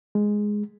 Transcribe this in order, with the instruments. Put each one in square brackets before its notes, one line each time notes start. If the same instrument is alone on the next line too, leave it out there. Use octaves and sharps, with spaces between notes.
[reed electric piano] G#3